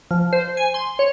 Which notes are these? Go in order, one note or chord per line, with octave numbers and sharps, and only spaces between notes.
F3
C5
G#5
C6
C#5